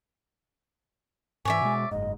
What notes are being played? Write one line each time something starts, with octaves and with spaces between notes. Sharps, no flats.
G#2 E3 C#5 D5 E5 G#5
B2 G#3
F#1 G#2 D#5